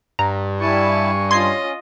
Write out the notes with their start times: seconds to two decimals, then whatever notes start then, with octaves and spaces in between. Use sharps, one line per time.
0.19 G2 A#5
0.60 G3 E4 G#5 A5 C#6
1.31 C#4 F4 D#5 C6 G#6 C7